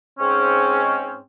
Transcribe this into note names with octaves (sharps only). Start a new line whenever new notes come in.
G#2 C4 C#4